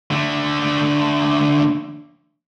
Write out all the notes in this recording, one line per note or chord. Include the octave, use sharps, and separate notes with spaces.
D3 A3